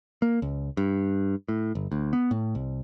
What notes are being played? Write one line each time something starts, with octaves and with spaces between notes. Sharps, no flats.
A#3
C#2
G2
A2
G1
D2
B3
A2
C2